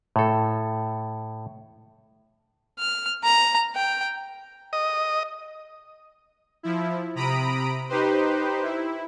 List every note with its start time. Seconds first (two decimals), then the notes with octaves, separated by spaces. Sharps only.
0.16 A2 A4
2.79 F6
3.24 A#5
3.76 G5
4.73 D#5
6.63 F3 E4
7.15 C3 A#5 B5 D#6 D7
7.89 D#4 G4 B4 C5
8.63 E4